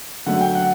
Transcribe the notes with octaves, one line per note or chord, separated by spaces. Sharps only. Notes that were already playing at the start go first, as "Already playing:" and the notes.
D3 F#3 A3 F#5
G5
F#5